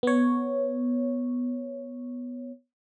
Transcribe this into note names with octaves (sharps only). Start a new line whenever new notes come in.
B3 C#5